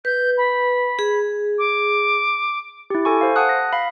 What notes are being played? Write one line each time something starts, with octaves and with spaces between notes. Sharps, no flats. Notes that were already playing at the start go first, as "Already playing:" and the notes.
B4 G6
B5
G#4
D6
E4 G4
A4 G#5 C#6
C5 F5
F#5 A5 D#6 F#6
A#6
F5 B5